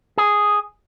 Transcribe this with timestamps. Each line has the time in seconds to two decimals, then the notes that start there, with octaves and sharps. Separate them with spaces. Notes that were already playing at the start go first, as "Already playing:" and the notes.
0.18 G#4